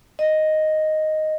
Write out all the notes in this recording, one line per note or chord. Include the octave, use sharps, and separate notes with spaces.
D#5